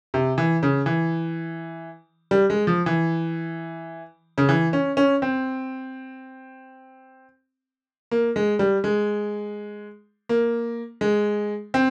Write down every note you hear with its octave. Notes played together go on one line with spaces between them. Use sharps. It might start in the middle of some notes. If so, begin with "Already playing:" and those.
C3
E3
C#3
E3
G3
G#3
F3
E3
C#3
E3
C#4
C#4
C4
A#3
G#3
G3
G#3
A#3
G#3
C4